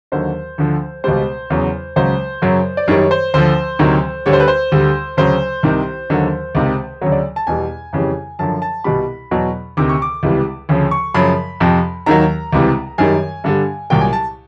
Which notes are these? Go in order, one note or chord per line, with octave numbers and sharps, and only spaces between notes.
D#2 D3 F#3 C5
D2 D3 F3
C#2 B2 G3 C5
E2 C#3 F#3
C#2 C#3 F#3 C5
F#2 C#3 F#3
D5
F#2 D#3 G3 C#5
C5
D2 D3 F3 C5
D2 C3 D#3 F#3
D2 D3 G3 C#5
C5
B4
C5
D2 D3 G3
D2 C#3 F#3 C5
C2 C3 D#3
D#2 D3 F#3
C#2 C3 D#3
D2 C#3 F#3 C#5
D5
A5
E2 B2 G3 G#5
F2 C#3 E3 G3
F#2 D3 F3 A5
A5
C2 B2 G3 B5
E2 B2 F#3
D2 C3 D#3 D6
C#6
D6
C#2 C3 E3 G3
D2 C#3 F3
C#6
F#2 C#3 F3 B5
F2 C3 F3
D#2 D#3 F#3 A#5
C#2 C3 E3 G3
F#2 D#3 G3 G#5
G2 D3 G3
C2 A#2 F#3 G5
G#5
A5